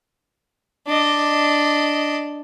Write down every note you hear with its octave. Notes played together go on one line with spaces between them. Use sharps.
D4 D#5